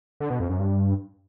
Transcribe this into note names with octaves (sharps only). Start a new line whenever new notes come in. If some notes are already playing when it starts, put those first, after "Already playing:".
D3
B2
F2
F#2
G2